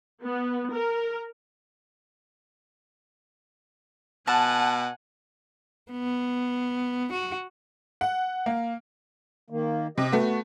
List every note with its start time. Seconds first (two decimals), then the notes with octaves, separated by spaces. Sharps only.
0.24 B3
0.72 A#4
4.27 B2 F#5 G#5 A5
5.92 B3
7.12 F#4
8.01 F#5
8.46 A#3
9.50 D#3 A#3
9.98 C3 G4 D#5
10.12 A3 B3 F#4